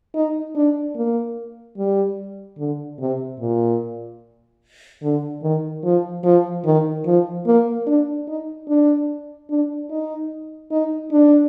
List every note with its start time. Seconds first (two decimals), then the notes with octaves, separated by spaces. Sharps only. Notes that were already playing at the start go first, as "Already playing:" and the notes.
0.15 D#4
0.55 D4
0.96 A#3
1.77 G3
2.58 D3
2.99 C3
3.40 A#2
5.02 D3
5.43 D#3
5.84 F3
6.24 F3
6.65 D#3
7.06 F3
7.46 A#3
7.87 D4
8.28 D#4
8.68 D4
9.50 D4
9.90 D#4
10.71 D#4
11.12 D4